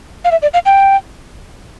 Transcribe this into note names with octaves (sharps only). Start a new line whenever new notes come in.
F5
E5
D5
F5
G5